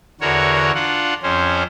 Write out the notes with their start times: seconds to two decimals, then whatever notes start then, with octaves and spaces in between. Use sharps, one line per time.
0.21 E2 D3 F#4 A#4 C#5
0.74 D4 F4 F#5
1.23 F2 C#4 C5